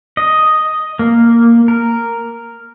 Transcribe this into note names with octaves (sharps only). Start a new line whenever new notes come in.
D#5
A#3
A#4